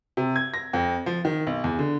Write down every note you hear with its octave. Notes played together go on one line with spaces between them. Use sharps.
C3
G#6
A#6
F2
F3
D#3
B1
E2
D3